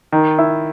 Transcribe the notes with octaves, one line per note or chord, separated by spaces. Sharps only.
D#3
E4